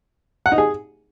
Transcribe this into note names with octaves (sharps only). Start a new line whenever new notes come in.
F#5
D#4
G#4